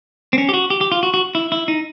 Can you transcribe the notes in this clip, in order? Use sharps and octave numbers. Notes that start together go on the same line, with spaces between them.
C4
C#4
G4
F#4
G4
G4
F4
F#4
F#4
E4
E4
D#4